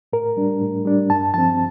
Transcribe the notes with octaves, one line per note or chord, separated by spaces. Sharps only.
A2 A#4
G3 D4
A2
G3 D4
G2 A5
F3 C4 A5